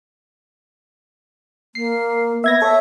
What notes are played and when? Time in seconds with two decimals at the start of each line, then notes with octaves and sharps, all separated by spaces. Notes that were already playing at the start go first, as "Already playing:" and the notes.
1.75 A#3 C7
2.44 B3 E5 G#6 A#6
2.62 A4 C#5 E5